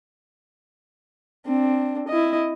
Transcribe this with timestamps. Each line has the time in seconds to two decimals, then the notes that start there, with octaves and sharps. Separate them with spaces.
1.46 C4 D4
2.08 E4 D#5